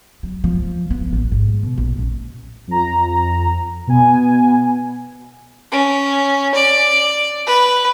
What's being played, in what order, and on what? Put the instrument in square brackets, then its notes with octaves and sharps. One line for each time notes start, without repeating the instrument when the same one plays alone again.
[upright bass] F#3
F3
B3
A1
G#2
B2
A#1
C#4
[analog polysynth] F2 A#5
B2 B3 G#5
[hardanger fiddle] C#4
D5
B4